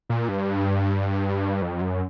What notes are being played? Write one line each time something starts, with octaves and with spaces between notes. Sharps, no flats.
A#2
G2
F2
F#2